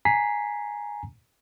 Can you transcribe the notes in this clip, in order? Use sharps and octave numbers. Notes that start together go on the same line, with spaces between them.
G#5 A#5 B6 C7